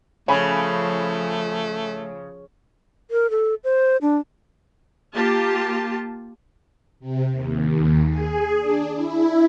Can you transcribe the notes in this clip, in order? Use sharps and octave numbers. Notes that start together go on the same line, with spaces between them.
C#3 F3 A3 C#5 G#5 B5
A#4
A4
C5
D4
A#3 F4 G4 A5
C3
D#2
G#4
D4
E4